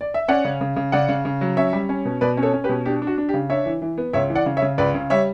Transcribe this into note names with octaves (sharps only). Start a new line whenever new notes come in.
D5
E5
C#4 D5 F#5
C#3
C#3
C#3
C#3 D5 F#5
C#3
C#3
F#3
C#4 C#5 E5
G3
C#4
B2
B2 B4 D5
C#4
A4 C#5
C#4
G4 B4
B2
D4 G4
D4
F#4
D4
G4
C#3
D4 C#5 E5
E3
E3
B3
C#2 C#5 E5
E3
D5 F#5
C#3
C#5 E5
C#3
C#2 B4 D5
C#3
G3 C#5 E5